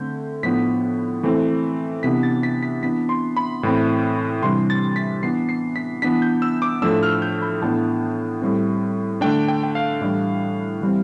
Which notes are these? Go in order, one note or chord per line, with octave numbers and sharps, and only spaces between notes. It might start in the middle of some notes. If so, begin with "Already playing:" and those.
Already playing: D3 A3 C4 G6
A2 F3 B3 D4 B6
E3 A3 C4
C3 E3 B3 D4 B6
A6
B6
B6
E3 B3 D4 B6
C6
B5
A2 E3 A3 C4
C3 E3 G3 D4 C6
A6
B6
E3 B3 D4 C7
C7
B6
E3 B3 D4 B6
G6
E6
D6
A2 F3 A3 D4 E6
F6
G6
B5
A2 E3 B3 D4 A5
A2 G3 C4
D3 A3 D4 G5
G5
G5
F5
A2 E3 G3 D4
E3 G3 C4